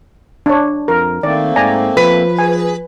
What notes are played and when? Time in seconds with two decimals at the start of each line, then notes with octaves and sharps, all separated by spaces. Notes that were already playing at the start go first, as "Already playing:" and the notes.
0.46 D4 C#5
0.88 F2 A#4
1.23 D#3 A3 A#3 C4 D5
1.56 G#2 D5 G#5 A#5
1.97 F3 B4
2.39 G#4 G#5